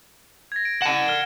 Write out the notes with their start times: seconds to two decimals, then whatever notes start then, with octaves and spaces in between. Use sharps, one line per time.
0.52 G#6 A#6
0.65 D7
0.82 F#5 A5 E7
1.08 F6 G7